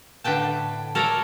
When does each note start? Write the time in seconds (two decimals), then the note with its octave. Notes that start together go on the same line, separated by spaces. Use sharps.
0.24 A2 D3 B4 G5 A5
0.95 A4 A#4 C#5 D5 F5